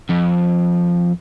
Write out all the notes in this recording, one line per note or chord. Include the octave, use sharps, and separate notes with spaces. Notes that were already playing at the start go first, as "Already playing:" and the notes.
F2